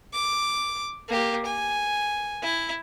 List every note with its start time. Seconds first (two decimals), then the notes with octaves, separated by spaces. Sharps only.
0.13 D6
1.08 A#3 G4
1.46 G#5
2.42 E4